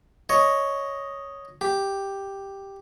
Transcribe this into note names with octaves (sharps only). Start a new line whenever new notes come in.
C#5 D#5
G4